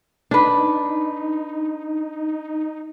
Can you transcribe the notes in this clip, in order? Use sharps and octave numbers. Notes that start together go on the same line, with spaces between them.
D4 D#4 B4